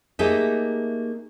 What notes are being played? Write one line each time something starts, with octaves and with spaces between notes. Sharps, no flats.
A3 A#3 D#4 G4 G#4 E5